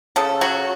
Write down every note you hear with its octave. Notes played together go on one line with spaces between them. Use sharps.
C#3 A4
F#3 F#4